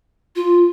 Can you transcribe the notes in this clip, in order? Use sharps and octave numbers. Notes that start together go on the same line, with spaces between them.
F4